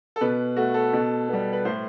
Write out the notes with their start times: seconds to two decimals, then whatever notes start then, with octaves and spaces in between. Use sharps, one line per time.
0.16 A4
0.21 B2 B4
0.56 A3 F#4
0.74 A4
0.93 B2
1.28 G3 B3
1.53 B4
1.65 A2 C5